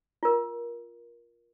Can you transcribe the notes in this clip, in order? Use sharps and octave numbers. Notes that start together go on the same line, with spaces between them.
F4 A#4